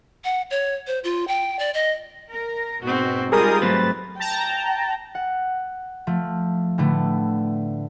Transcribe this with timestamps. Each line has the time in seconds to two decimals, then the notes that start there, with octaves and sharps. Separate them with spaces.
0.24 F#5
0.51 C#5
0.87 C5
1.04 F4
1.28 G5
1.59 D5
1.74 D#5
2.31 A#4
2.83 G#2 B2 C4 F#4
3.32 G3 G#3 D#4 F4 G#4 A#4 D#6
3.62 G#2 F#3 A3 C4 B4 A6
4.20 G5 A5 A#5
5.15 F#5
6.07 F3 A3
6.78 A2 D3 A3 B3